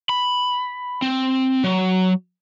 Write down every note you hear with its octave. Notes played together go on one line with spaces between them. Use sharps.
B5
C4
F#3